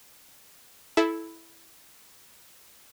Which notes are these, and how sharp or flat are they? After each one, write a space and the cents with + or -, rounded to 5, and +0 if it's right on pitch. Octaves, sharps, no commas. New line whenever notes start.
E4 +0 A4 -20